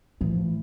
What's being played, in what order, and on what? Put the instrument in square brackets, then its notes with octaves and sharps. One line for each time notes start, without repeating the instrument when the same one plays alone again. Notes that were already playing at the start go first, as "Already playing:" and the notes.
[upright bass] A2 [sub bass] E3
[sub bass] F3
E3